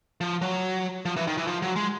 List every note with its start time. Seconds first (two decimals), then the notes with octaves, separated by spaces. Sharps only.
0.21 F3
0.42 F#3
1.05 F3
1.16 E3
1.27 D#3
1.37 E3
1.47 F3
1.62 F#3
1.76 G#3